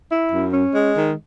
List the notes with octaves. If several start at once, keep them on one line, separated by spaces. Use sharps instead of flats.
E4
F#2
C#4
G#3
D#3